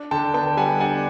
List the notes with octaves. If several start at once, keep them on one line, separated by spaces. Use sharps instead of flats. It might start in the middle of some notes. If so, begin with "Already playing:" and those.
Already playing: D4
D3 G5 A5
B3 G5 A5
G3 F#5 G#5
D4 F#5 G#5